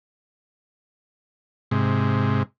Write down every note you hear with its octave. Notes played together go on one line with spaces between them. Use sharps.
G#2 C3